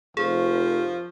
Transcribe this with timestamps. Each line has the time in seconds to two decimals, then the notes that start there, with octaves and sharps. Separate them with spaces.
0.17 F1 F3 G#4